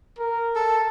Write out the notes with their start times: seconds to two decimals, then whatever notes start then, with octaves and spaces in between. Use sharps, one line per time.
0.19 A#4
0.55 A4